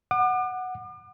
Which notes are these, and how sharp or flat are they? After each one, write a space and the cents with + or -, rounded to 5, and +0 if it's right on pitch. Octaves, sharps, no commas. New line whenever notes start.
F#5 +0 D6 +40